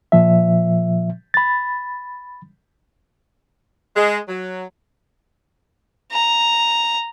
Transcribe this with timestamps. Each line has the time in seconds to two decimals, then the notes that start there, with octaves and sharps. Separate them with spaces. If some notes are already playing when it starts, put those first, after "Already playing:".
0.12 A#2 F3 E5
1.34 B5 A6
3.95 G#3
4.28 F#3
6.12 A#5